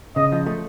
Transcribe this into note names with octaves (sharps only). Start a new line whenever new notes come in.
C#3 D#5
F3
A3